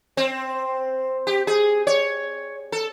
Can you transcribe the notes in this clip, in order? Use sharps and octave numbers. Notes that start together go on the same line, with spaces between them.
C4
G4
G#4
C#5
A4